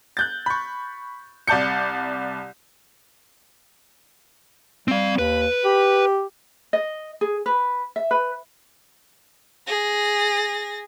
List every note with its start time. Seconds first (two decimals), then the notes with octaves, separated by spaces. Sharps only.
0.17 F#6 G6 A6
0.46 B5 C#6
1.48 C2 D5 A5 G6 C#7
4.88 G3 C4 F5
5.19 D#2 B4
5.65 G4
6.73 D#5
7.21 G#4
7.46 B4
7.96 E5
8.11 B4
9.67 G#4 A#6